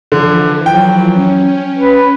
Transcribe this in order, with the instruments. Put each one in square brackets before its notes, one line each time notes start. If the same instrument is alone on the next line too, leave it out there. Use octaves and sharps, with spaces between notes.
[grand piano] D3 [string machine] E3 F3
[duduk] F#3 [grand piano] G5
[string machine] C#4
[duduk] B4